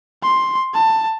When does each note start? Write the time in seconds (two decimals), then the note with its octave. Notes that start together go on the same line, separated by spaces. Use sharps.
0.23 C6
0.74 A5